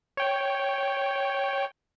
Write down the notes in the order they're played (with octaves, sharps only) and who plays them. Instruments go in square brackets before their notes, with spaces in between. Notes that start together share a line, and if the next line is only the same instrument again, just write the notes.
[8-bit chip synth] C#5 G5